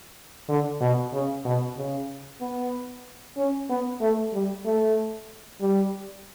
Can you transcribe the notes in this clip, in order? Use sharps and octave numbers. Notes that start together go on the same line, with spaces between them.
D3
B2
C#3
B2
C#3
B3
C#4
B3
A3
G3
A3
G3